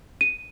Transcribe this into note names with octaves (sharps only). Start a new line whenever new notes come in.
D#7